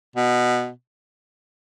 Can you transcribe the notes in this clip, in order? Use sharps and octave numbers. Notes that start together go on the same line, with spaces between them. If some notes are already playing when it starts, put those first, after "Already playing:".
B2